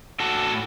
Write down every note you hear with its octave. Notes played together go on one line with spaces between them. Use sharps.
A2 F#4 A4